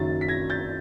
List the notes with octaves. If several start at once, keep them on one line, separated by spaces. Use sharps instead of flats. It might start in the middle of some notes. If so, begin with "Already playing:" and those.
Already playing: F#1 F#2 D#3 F#3 A6
B6
G#6 A#6
G6 A6